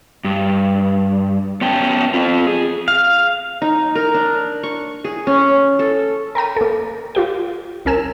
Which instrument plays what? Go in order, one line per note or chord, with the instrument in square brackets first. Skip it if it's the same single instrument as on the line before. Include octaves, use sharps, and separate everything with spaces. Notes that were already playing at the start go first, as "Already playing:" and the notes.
[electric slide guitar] G2
B3 C#4 G5 A5
C4 F4
G#4
[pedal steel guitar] F5
[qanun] D#4
A#4
D4
C#6
G#4
C#4
A4
[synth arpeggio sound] A#4 G5 A#5 D#7
A#3 A4
F4 G4 G5
C2 C#4 A#4 G#5 E6 E7